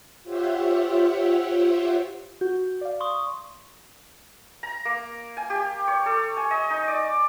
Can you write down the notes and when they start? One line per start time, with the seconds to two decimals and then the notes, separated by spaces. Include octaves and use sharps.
0.23 F4 G4 C5 C#5 E5 F#5
2.41 F#4 G6
2.81 D5 F5
3.01 C6 C#6 D#6
4.63 A#5
4.85 A#3
5.37 G#5
5.50 G4
5.88 C#5
6.06 A4
6.37 G#5
6.51 D#5
6.70 D#4
6.88 D5